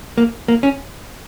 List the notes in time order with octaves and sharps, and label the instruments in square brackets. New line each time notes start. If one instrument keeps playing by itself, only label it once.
[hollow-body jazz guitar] A#3
A#3
C#4